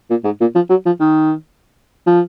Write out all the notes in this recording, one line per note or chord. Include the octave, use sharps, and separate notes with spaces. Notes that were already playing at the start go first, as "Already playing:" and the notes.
A#2
G#2
A#2
F3
F#3
F3
D#3
F3